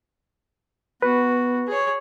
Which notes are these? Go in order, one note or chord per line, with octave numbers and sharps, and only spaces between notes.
B3 F#4 B4
G#4 C#5